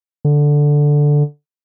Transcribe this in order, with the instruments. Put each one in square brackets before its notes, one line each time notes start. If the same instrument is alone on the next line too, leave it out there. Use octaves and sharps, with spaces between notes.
[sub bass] D3